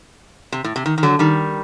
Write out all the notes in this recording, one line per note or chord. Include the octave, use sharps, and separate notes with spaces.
C3
A2
C3
D#3
D#3
D3 F#3
D#3 G3